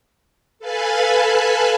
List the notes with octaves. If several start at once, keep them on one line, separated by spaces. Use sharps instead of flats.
A4 B4 F5 G#5 A5 B5